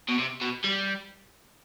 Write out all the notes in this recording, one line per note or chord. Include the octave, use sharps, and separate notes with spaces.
B2
C3
B2
G3